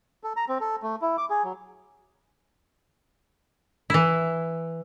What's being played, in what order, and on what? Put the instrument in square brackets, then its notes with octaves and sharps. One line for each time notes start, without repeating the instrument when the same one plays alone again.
[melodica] A4
A#5
C4
A4
A3
E4
D6
G#4
F#3
[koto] E3 E4